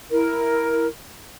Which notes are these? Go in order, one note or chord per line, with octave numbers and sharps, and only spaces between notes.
E4 A#4